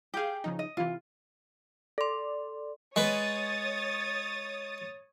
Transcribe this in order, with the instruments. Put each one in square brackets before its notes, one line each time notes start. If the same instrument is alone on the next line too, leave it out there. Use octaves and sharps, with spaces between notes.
[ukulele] G4 G#4 [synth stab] F5 G6
[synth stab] C#3 F3 D#4
[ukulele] D#5
[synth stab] C3 E3 [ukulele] F4
[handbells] A4 C6 [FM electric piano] D5
[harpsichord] G#3 B4 [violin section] C#5 D#6 A6